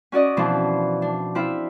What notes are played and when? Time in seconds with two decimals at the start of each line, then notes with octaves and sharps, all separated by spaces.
0.12 C#4 F#4 D5 D#5
0.37 B2 E3 F3 C4 D4
1.02 D4
1.35 C4 E4 F4 E5